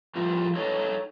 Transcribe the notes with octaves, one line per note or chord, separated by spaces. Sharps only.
A2 F3 G3 F4
D#4 A4 C#5